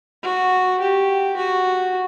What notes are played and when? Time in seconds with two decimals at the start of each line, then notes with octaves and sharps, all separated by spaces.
0.23 F#4
0.80 G4
1.37 F#4